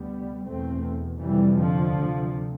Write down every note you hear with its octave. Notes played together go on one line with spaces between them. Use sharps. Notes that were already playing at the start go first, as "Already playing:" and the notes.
Already playing: D2 C3 G3 B3
E2 B2 A3 C4
F2 C3 E3 G3
D3 F3
D2 C3